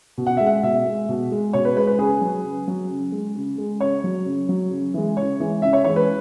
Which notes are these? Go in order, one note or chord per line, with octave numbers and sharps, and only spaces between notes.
B2
F#5
G#3 E5
F#5
B2 E5
G#3
B2
G#3
B2 C#5
B4
G#3 B4
B4
C#3 G#4
F#3
C#3
F#3
C#3
G#3
C#3
G#3
C#3 C#5
F#3
C#3
F#3
C#3
E3 G#3
C#3 C#5
E3 G#3
C#3 E5
C#5
E3 G#3 C#5
B4